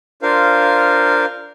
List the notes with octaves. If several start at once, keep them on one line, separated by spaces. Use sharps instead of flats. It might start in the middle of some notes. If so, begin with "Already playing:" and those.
D4 F4 A#4 C5 F5